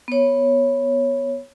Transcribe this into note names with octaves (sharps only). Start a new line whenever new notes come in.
B3 C#5